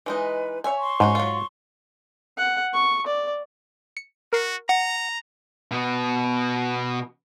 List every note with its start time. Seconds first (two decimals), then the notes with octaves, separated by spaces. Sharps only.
0.06 E3 G#3 D#4 B4
0.64 C#5 E5 G#5
0.78 C6 C#6
1.00 G#2 A3 C#4 F#4
1.15 F#3 F4
2.38 F#5
2.74 C#6
3.06 D5
3.97 C#7
4.33 F#4 A#4 C7
4.69 F#5 A#5
5.71 B2 B3